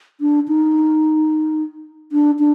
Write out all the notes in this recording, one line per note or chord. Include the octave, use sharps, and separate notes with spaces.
D4
D#4
D4
D4